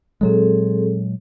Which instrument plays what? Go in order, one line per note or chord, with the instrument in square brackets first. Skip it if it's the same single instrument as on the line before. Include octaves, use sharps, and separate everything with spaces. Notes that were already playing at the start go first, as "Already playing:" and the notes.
[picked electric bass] A#2 F#3 G#3 [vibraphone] C4 G#4 A4